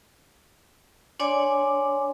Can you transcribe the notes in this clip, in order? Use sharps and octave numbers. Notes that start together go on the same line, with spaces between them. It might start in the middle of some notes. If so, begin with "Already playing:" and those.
D4 C#5 D5 G#5 C6 D6